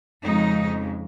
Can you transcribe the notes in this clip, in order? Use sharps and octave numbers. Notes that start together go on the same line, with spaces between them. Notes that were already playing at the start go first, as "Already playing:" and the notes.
F2 C#3 G#3 D#4